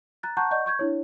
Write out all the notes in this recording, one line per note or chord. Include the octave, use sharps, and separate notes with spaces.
A#5 F#6 A6
F#5 A5 A#5 C#6 F#6 G6
D5 D#5 F#5 C#6 G6
C#6 G6 G#6
D4 E4 C#5